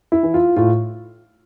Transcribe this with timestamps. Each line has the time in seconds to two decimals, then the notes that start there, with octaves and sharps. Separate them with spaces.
0.12 E4
0.23 E3
0.34 F4
0.56 A2 F4